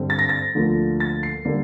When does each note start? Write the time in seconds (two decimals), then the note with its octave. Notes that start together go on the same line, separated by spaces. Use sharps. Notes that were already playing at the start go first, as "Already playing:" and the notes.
Already playing: G2 D3 G3 C4
0.10 A6
0.19 A#6
0.29 A6
0.55 D2 D3 F3 A#3
1.00 A6
1.23 C7
1.45 D3 G3 A#3 D4